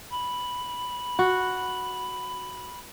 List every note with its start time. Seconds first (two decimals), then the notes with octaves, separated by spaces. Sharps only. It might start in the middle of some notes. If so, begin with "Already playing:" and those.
0.11 B5
1.19 F#4